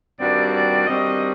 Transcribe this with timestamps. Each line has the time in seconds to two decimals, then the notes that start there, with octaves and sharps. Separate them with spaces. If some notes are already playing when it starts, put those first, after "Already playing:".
0.20 G2 D#3 G3 C4 F#4 D5
0.54 D5
0.87 G2 D#3 G3 C4 F#4 D#5